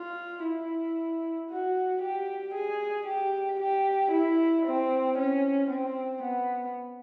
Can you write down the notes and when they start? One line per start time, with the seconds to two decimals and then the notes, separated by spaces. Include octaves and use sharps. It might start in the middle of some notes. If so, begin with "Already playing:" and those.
Already playing: F4
0.43 E4
1.50 F#4
2.02 G4
2.54 G#4
3.06 G4
3.59 G4
4.12 E4
4.65 C4
5.18 C#4
5.70 C4
6.22 B3